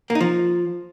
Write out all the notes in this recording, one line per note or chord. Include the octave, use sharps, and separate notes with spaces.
A#3
D#4
F3